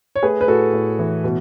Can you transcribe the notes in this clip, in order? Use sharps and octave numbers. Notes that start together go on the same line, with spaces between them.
C#5
A3 G#4 B4
B4
A2 F#4 A4
A2
E3
B2